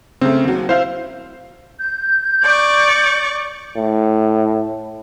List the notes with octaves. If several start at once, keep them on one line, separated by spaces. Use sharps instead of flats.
C#3 A3 C4
D#2 F#3
E4 C5 F5 G6
G6
D5 C#6 D6
A2